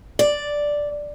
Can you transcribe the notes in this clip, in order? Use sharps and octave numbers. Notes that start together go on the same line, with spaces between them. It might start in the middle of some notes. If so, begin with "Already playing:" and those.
D5